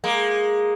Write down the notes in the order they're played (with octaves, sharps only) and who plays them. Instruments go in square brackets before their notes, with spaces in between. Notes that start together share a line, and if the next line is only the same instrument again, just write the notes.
[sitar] G#3 A#3